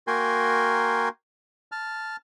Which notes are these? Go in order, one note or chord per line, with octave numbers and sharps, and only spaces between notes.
A#3 F#4 A#4 G5 G#5 C6
A5 F6